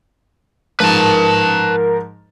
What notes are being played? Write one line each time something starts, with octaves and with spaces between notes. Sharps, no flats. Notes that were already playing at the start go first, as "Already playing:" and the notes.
G#2 F3 A#4 B4 A5